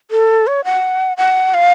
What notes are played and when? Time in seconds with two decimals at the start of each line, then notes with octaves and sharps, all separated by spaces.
0.11 A4
0.47 C#5
0.64 F#5
1.17 F#5
1.54 F5